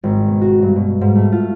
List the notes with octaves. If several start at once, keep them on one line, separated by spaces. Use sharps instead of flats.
G#1
B2
F#4
G2
B2
G#2
A3
F4